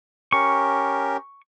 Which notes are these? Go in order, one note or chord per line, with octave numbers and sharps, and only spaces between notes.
C#4 G4 A#4 C#6